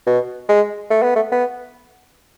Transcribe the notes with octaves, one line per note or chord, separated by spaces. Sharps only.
B2
G#3
A3
B3
A3
B3